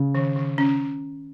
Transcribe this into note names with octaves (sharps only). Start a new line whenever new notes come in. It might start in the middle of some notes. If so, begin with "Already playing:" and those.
Already playing: C#3
D#3
D#3
C#4